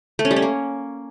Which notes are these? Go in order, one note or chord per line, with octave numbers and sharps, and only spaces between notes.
A3
C#4
G3
C#4
A#3